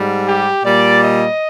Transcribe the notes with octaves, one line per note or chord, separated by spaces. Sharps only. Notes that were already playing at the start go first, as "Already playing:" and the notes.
Already playing: G#2 G3
G4
A#2 G3 D5
D#5